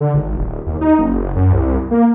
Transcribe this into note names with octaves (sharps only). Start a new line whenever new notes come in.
D3
G#1
D1
D#2
D#4
F#1
F#2
C2
A#3